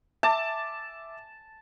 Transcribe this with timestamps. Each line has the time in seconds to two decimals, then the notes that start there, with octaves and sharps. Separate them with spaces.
0.23 E5 A5 D6